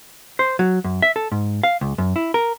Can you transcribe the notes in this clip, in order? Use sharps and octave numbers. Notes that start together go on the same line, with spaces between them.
C5
F#3
F#2
E5
A4
G#2
F5
C#2
F#2
E4
A#4